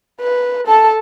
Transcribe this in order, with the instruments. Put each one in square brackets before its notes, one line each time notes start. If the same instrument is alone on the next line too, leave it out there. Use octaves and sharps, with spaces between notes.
[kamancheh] B4
A4 A5